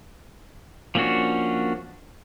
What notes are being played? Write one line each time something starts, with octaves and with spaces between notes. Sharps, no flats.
F3 A#3 C#4 D4 F#4